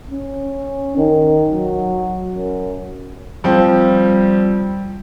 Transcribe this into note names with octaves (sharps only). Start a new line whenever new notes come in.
C#4
D#3
F#3
F#2
F3 G3 C4